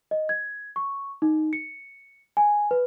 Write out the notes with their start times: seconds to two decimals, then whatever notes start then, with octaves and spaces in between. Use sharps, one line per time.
0.11 D#5
0.29 G#6
0.76 C#6
1.22 D#4
1.53 C#7
2.37 G#5
2.71 B4